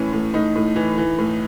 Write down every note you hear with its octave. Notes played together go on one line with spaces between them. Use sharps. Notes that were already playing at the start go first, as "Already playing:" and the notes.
Already playing: A2 E3 C#4
A2
A2 D#4
A2
E3
E3
A2